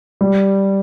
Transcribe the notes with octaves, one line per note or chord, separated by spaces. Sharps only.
G3